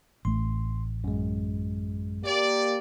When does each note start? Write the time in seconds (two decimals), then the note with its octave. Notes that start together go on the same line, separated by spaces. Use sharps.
0.25 A1 A3 C6
1.04 F#2 G#3
2.24 A#3 G4 D5